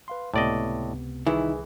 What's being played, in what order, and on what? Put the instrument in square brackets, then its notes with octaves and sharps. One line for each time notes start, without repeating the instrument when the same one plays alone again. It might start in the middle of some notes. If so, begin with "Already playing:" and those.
[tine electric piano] B4 F5 C6
[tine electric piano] C#2 C3 B3 [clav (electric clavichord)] A2 D5 D#5
[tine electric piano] C2 G#4 B4 [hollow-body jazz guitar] D#3 E4 [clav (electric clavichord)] E3